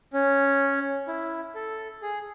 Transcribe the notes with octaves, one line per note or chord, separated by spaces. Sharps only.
C#4
E4
A4
G#4